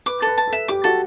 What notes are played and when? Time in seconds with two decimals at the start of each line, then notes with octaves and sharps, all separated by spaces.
0.06 B4 D6
0.22 A4 B4
0.38 A5
0.47 A4
0.53 E5
0.68 G4 D6
0.84 F#4 A4